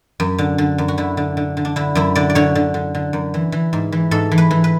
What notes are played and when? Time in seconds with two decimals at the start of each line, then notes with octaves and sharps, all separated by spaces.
0.20 F#2
0.38 D3
0.58 D3
0.78 F#2
0.88 F#4
0.98 D3 E4
1.17 D3
1.37 D3
1.57 D3
1.65 D4
1.76 D3 E4
1.95 F#2 E4
2.15 D3 D5
2.30 D5
2.35 D3 C#5
2.55 D3
2.74 D3
2.95 D3
3.13 F#2
3.34 E3
3.52 E3
3.73 G#2
3.92 E3
4.11 G#2 A4
4.32 E3
4.38 B4
4.51 E3
4.64 B4